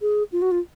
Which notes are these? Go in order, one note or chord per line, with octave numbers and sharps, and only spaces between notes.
G#4
F4
F#4
F4